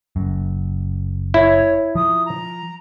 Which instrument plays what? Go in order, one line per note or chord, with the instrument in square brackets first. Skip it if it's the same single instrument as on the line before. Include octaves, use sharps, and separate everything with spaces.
[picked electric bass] F#1 F#2
[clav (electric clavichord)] E4 [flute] C#5
[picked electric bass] F3 [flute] D#6
[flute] A#5